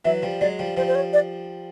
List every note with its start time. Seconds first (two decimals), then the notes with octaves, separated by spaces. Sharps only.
0.05 E3 F#3 E5
0.22 F3 G3
0.41 F#3 G#3 D5
0.59 F3 G3
0.77 F3 G3 C5
0.88 C5
0.95 C#5
1.13 D5